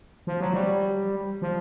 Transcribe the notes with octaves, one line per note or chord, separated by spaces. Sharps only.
F3
F#3
G3
F3